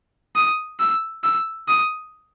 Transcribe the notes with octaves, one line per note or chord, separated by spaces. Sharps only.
D#6
E6
E6
D#6